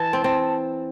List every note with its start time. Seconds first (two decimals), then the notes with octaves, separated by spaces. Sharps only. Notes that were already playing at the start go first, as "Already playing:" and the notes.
Already playing: E3 A5
0.13 C4
0.24 C4